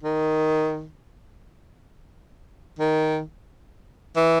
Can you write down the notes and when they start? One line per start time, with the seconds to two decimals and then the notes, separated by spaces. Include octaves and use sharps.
0.03 D#3
2.79 D#3
4.16 E3